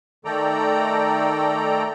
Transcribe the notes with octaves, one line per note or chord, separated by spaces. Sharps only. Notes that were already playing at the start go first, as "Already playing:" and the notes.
D#3 A3 A4 D5 G5 A#5